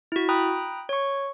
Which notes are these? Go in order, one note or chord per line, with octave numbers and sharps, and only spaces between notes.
E4 F#4
G5 A#5 B5 D#6 F#6
C#5 C#6